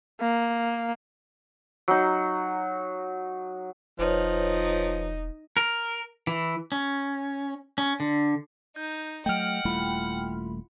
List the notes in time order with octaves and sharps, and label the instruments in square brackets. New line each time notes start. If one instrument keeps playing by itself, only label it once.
[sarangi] A#3
[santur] F#3 D#4
[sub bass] E1 [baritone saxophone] F3 [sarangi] D#4 [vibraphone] B4 C#5
[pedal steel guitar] A#4
E3
C#4
C#4
D3
[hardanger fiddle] D#4 [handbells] G6
[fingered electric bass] F#3 A3 [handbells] D#5 D7 [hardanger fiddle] F#5 [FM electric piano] G5 F6
[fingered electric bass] D#1 G3 A3 [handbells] E4 F4 B5